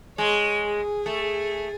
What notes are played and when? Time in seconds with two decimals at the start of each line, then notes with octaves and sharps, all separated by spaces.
0.18 G#3 C#5
0.62 G#4
1.06 A3